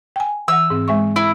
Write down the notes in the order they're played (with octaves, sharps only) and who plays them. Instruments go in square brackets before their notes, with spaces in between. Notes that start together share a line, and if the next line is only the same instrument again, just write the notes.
[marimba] G5 G#5
[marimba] E3 F#5 [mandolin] E6
[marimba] G#2 C4
G#3 E5 C#6
[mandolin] E4